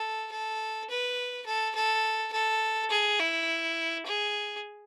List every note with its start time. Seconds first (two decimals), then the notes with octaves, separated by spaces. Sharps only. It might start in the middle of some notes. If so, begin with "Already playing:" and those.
Already playing: A4
0.31 A4
0.90 B4
1.46 A4
1.75 A4
2.32 A4
2.90 G#4
3.20 E4
4.06 G#4